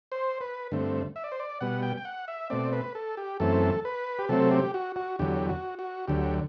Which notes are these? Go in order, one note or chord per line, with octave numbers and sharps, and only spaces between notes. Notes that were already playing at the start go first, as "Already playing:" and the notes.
C5
B4
G2 D3 A3 C4
E5
D5
C5
D5
B2 G3 B3 F#5
G5
G5
F#5
E5
B2 A3 C4 D5
B4
A4
G4
F#2 E3 A3 C4 A4
B4
G4
C3 F#3 A3 C4 A4
G4
F#4
F#4
E2 D3 F#3 G4
F#4
F#4
D2 D3 F#3 G4